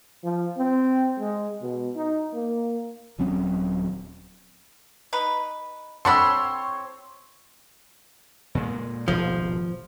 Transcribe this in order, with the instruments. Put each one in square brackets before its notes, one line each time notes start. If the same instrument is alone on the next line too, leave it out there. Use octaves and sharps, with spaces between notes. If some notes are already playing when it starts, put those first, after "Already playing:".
[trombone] F3
C4
G#3
B2
D#4
A#3
[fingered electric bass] D#1 F#3 C4 C#4
[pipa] D#4 B4
[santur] C4 C#5 [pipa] A4 F#5 B5 [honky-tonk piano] C6 E6
[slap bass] A#2 G#3
[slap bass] D#1 G#1 B2 [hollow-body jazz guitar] F3